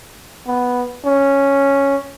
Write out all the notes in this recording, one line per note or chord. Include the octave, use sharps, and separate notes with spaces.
B3
C#4